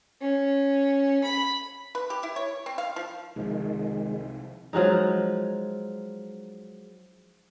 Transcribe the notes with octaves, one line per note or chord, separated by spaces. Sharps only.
C#4
B5
B4
G4
E4
C#5
C4
F5
F3
C2 C3 D#3 F3 G#3
F3 F#3 G#3 D#4